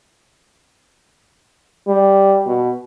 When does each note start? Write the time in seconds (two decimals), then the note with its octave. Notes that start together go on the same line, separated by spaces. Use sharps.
1.87 G3
2.47 B2